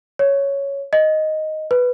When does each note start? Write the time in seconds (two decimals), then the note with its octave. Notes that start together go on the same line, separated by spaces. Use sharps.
0.19 C#5
0.93 D#5
1.71 B4